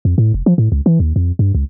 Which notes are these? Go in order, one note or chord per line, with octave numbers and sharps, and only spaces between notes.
F2
A2
F1
F3
A2
C#2
E3
D#2
F2
G2
C#2